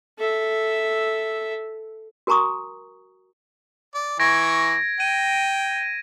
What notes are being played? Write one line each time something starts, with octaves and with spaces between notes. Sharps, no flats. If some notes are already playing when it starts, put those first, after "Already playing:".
A4 E5
F#4 A#4 G#5 A#5 C#6 D#6
D5
E3 C#6 G#6 A#6 D7
G5 D#7